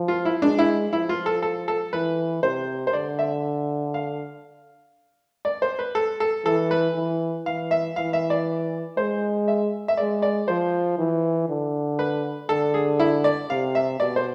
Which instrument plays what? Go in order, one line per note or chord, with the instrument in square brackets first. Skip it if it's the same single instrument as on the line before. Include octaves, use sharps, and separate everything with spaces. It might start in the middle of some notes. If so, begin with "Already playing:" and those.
Already playing: [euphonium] F3
[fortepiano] F4
E4
[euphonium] G#3 [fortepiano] D4
[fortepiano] E4
[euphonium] F3 [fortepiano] E4
[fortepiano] F4
A4
A4
A4
[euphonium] E3 [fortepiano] B4
[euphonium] C3 [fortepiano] C5
[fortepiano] C5
[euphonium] D3 [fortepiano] D5
[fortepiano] E5
F5
D5
C5
B4
A4
A4
[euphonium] E3 [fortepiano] A4
[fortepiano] B4
[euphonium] E3
[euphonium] E3 [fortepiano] F5
[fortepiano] E5
[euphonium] E3 [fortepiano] F5
[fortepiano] E5
D5
[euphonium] G#3 [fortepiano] C5
[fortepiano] E5
E5
[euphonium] G#3 [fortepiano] D5
[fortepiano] D5
[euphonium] F3 [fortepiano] C5
[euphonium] E3
D3
[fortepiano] B4
[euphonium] D3 [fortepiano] A4
[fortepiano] G#4
E4
D5
[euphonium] C3 [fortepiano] F5
[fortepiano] E5
[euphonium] B2 [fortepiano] D5
[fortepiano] C5